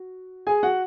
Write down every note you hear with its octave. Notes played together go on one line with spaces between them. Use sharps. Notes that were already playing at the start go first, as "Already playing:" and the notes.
Already playing: F#4
G#4 G#5
F#4 F#5